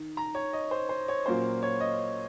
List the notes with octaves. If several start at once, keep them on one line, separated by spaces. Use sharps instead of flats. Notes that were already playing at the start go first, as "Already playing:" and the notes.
Already playing: D#3
A#5
C#5
D#5
C5
C5
C#5
A#2 F#3 A#3 C#4 F4 C5
C#5
D#5